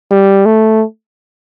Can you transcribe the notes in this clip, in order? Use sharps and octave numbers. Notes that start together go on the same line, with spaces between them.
G3
A3